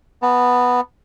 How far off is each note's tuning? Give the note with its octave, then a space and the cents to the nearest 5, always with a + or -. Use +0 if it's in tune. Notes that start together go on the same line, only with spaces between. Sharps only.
B3 +0 A5 +40